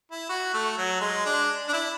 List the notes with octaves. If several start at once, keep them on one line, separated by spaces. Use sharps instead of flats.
E4
F#4
A3
F#3
G#3
D4
D4
E4